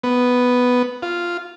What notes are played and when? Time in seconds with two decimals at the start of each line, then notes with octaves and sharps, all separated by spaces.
0.04 B3
1.02 F4